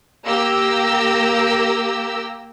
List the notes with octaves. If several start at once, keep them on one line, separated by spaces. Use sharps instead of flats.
A#3 G4 E6 A#6